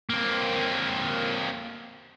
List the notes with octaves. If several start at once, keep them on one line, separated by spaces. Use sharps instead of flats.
A#3 C4